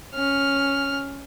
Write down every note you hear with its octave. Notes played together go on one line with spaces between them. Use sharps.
C#4 F6